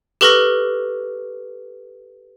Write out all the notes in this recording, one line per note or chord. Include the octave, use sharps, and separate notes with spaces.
G4 A4 B4 C#6 F6 A#6